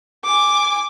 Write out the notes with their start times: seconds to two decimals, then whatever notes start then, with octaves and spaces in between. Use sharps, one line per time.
0.24 G#5 D6